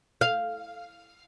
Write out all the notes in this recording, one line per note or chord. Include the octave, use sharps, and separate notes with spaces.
F5